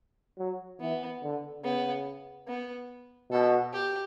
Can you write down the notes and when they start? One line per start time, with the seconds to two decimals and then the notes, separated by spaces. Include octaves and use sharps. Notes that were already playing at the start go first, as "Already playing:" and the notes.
0.38 F#3
0.81 E3 B3
1.22 D3
1.64 C#3 B3
2.48 B3
3.31 B2 A4
3.73 G4